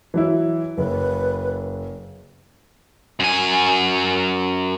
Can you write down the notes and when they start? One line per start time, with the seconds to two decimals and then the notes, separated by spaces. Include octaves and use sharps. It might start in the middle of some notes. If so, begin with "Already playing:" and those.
0.14 E3 F#3 E4
0.78 F#1 B4
3.20 F#2 G#5